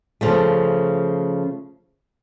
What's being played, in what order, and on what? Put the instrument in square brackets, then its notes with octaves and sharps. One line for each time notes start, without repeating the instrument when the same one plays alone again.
[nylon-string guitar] C#3 F3 A3